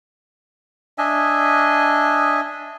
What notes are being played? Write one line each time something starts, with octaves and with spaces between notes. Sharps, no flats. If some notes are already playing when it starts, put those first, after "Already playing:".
D4 D#5 E5 G#5